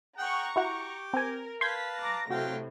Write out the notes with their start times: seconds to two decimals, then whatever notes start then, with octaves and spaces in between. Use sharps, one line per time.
0.18 G#4 F#5 G5 A#5 C#6
0.56 E4 F#4 G4 F#5
1.13 C4 A#4 G#5
1.61 B4 F5 A5 C6 G6 G#6 B6
1.99 A#5 D6 A#6
2.31 A2 C3 F#3 F#4 F5 G5